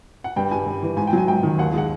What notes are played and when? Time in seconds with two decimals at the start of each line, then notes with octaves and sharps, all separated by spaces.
0.24 F#5
0.36 G2 G5
0.51 G3 G#5
0.66 G2
0.83 E3
0.97 G#2 G#5
1.07 G5
1.13 F#3 G#5
1.27 G#2 G5
1.43 D#3
1.58 D#2 F#5
1.73 G#3 F#5